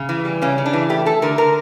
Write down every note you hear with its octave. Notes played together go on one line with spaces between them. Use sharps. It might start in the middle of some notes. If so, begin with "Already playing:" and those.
Already playing: C#3
E3
G3
C#3 C#4
C#3
D4
E3
A3 G4
A3 A4
D3 A#4
D3 A#4